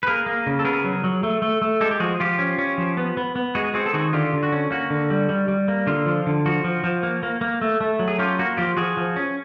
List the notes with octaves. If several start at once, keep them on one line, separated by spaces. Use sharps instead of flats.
B4
A#3 G#4 A#4
A#3
C#3
A4
B3 G#4 A#4
F#3
F#3
A3
A3
A3
G#3 G4 A4
G4
F3 F#4 G#4
F3 F4 G4
C#4
C#4
F3
B3
B3
B3
G#3 F#4 G#4
C4 F#4 G#4
A4
D#3 F#4 G#4
D3 F4 G4
D3
F#4
C#4
A#3 F#4
D3
G3
G3
G3
A#3
D3 F4
F3
D3
F3 F#4
F3
F3
A#3
A#3
A#3
A3
A3
F#3
G#4
C#4 F4 G4
A#3 F#4
F3 F4 G4
F3 F#4 G#4
F3
C#4